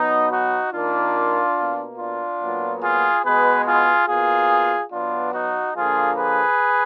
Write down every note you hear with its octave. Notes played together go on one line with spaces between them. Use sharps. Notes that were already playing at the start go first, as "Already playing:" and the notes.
Already playing: B2 F#3 B3 D#4
D#4 F#4
D#3 A#3 D4 F4
B2 A#3
D4 F4
A#2 F#3 B3
F4 G#4
B2 G#3 B3 G#4 B4
F4 G#4
B2 A#3 F4 G#4
B2 F#3 B3 D4 F4
D#4 F#4
D3 F3 A#3 F4 G#4
G#4 B4